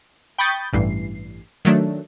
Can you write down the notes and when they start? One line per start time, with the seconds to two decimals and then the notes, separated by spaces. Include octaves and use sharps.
0.38 G5 B5 C#6 D#6 G6 A6
0.73 A1 G2 E3 C7
1.65 D#3 F#3 A3 D4